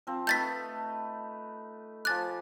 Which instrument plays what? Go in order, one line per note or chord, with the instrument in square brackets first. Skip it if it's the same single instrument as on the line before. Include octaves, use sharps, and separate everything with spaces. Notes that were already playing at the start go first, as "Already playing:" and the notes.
[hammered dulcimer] F3 C4
[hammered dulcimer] A3 D#4 B4 [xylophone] G6 A6 B6
[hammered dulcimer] F3 G#5 D6 [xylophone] F#6 A6